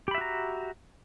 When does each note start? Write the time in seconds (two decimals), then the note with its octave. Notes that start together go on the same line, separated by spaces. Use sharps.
0.08 G4
0.11 B5
0.15 E5
0.18 F#4
0.21 A#5